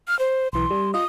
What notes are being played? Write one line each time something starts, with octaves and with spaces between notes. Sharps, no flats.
F6
C5
B1 E3 C6
G3
F4 D#5 D#6